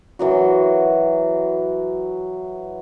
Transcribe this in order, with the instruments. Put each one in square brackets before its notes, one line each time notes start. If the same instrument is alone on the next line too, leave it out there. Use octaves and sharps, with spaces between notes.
[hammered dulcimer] E3 F#3 F#4